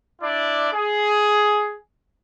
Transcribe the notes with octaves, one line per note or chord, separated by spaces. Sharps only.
D4 E4 D5
G#4